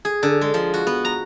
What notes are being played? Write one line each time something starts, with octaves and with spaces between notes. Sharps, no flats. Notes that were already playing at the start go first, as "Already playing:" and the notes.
G#4
D3
G#3
F3
F#4
B3
A#5